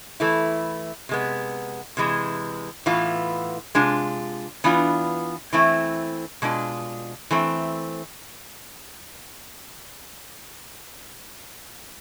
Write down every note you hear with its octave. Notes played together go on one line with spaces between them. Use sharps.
E3 A3 E4
C3 G#3 B3
C3 E3 G#3
A2 E3 B3 F4
C3 G#3 D4 F4
E3 B3 D4 F4
E3 A3 C4 E4
B2 G#3 D4 F4
E3 A3 C4